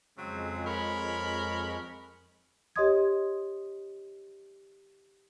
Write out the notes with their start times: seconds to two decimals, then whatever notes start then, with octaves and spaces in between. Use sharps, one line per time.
0.18 F2 C#3 F#3 G#3 C4
0.66 A#4 C#5 B5
2.76 G4 C#5 D#5 C6 D#6 G#6